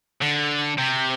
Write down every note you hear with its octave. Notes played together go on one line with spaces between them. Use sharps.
D3
C3